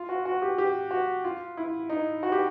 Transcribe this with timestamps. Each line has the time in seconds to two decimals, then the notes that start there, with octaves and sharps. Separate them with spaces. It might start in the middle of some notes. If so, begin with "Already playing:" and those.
Already playing: F4
0.09 F#4
0.25 F#4
0.42 G4
0.58 G4
0.91 F#4
1.25 F4
1.57 E4
1.89 D#4
2.23 F#4
2.32 G4